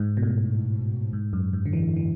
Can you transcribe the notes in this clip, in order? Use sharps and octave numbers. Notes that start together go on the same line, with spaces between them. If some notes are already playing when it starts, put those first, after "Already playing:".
Already playing: G#2
B2
A2
G#2
F#2
G#2
D3
E3
E3